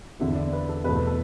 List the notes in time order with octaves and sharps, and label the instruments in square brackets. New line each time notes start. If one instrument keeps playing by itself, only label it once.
[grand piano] E2 D3 B3 E5
D5
B4
A4
E2 B2 A3 B4
A4
A4